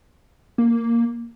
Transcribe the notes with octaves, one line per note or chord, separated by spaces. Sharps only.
A#3